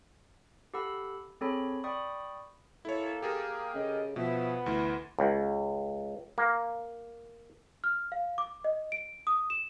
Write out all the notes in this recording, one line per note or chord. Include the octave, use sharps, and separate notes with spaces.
G4 A4 F#5 B5 E6
C4 G#4 A4 C#5 B5
D5 G5 B5 C#6 D#6
A#3 E4 A4 C#5
G4 G#4 A#4
C#3 A4 D#5
B2 F3 B3 E5
D2 E3 E4 C6
C#2
A#3
F6
F5
D6
D#5
D7
D#6
E7